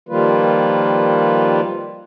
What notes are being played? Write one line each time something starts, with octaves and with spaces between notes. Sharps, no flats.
D#3 F3 G3 A#3 F4 B4